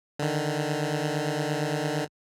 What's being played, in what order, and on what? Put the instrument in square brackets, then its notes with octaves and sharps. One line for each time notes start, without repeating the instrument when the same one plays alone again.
[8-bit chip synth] D3 D#3